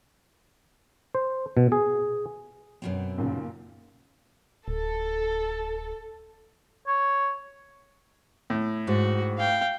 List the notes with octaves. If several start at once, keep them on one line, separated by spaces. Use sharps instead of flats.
C5
B2
G#4
F#2 B2 C4
D#2 A#2 C#3
D1 A4
C#5
A2
G#2 F#4
F5 G5